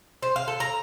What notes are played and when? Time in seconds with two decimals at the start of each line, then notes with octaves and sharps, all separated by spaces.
0.23 C5
0.36 F5
0.48 A4
0.60 A#5